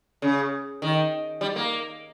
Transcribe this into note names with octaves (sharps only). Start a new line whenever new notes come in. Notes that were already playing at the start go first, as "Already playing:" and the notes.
C#3
D#3
G3
A#3